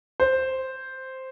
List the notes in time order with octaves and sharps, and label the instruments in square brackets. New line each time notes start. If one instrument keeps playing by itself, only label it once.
[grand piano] C5